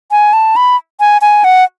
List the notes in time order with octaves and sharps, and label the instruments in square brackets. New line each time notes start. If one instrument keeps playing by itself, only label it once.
[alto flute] G#5
A5
B5
G#5
G#5
F#5